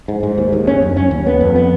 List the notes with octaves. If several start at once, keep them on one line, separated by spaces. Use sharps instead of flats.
G#2
G#2
D#2
D#2
C#4
F#2
C#4
D#2
B3
F2
B3